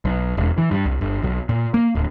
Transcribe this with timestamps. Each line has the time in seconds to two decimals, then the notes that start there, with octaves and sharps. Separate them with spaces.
0.05 B1
0.37 E1
0.58 E3
0.71 G2
0.86 C2
1.01 G1
1.23 B1
1.49 A#2
1.74 A#3
1.95 D1